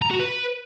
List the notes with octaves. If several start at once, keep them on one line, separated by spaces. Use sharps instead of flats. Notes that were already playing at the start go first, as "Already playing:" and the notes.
A#5
F#4
B4